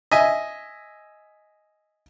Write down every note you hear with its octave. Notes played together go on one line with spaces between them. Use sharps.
D#5 E5 G#5